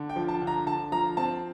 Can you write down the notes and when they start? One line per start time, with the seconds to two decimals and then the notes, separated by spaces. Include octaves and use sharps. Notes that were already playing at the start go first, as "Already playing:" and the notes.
Already playing: D3
0.09 G5
0.16 F3
0.28 A5
0.42 D3
0.47 A#5
0.66 D3 A5
0.92 F3 A#5
1.17 C4 A5